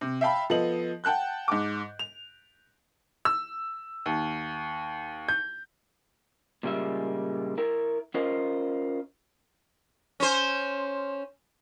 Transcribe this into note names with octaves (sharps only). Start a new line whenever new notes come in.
C3
E5 F5 G5 A5 B5
F3 B3 A4 D#5 F#7
F#5 G5 A5 F#6 G6
G#2 D6
F7
E6
D#2
G6
A#2 C#3 G3 G#3 E5
E4 A#4
C#4 F4 A#4 C5 D#5
C#4 C5